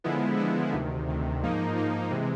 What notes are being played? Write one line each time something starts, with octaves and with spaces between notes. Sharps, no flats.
D3 F3 G#3 B3 E4
D3 F3 G#3 B3 E4
D2 C3 D#3
D2 C3 D#3
G#2 F3 A#3 D#4
G#2 F3 A#3 D#4
C3 E3 G#3